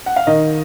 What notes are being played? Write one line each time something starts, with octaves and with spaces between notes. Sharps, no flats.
F#5
F5
D#3 D#5